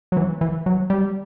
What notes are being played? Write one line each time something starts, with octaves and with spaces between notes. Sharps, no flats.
F#3
E3
E3
F#3
G3